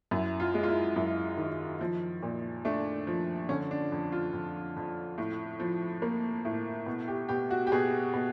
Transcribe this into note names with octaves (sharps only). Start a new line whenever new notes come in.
F#2 E4
F4
G#3
F4
E4
F#2 E4
D#3
F3
A#2
A3 D4
F3
D3 C#4
D4
F2
F4
F2
F2
A2
F3
A#3
A2
B2
G4
B2 G4
F#4
G4
B2 G#4
B2